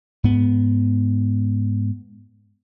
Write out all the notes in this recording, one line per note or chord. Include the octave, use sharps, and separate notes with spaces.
G#2 B3